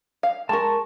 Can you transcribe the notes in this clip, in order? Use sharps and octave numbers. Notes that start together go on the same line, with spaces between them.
F5
G#3 A#4 A5 C#6